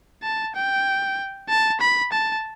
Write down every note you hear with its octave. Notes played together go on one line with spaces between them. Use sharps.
A5
G5
A5
B5
A5